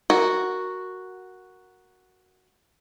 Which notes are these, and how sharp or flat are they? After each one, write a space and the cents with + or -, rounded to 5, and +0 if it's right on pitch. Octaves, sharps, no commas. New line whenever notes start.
F#4 +0 A#4 +0